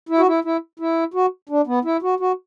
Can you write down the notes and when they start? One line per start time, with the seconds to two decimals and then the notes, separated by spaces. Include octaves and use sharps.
0.09 E4
0.18 F#4
0.27 E4
0.45 E4
0.79 E4
1.14 F#4
1.49 D4
1.67 B3
1.85 E4
2.02 F#4
2.20 F#4